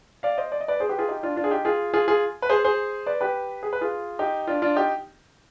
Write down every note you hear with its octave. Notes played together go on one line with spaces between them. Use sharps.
D5 F5
C5 D#5
D5
D#5
B4 D5
G#4 C5
G4 B4
F4 G#4
D#4 G4
D4 F4
D4 F4
G#4
D#4 G4
F4 G#4
F4 G#4
F4 G#4
B4
G#4 C5
G#4 C5
B4 D5
G4 B4
G#4
B4
F4 G#4
D#4 G4
D4 F4
D4 F4
D#4 G4